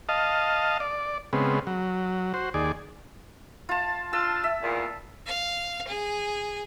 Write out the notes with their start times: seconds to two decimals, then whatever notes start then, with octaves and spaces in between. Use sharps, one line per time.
0.09 D#5 F5 A5
0.80 D5
1.33 C#3 G#3 B3 C4
1.67 F#3
2.34 F#4 C5
2.54 D#2 G#4 D5
3.69 F4 A5
4.13 D4 F4 A5 E6
4.44 E5
4.62 E2 A#2
5.26 F5
5.88 G#4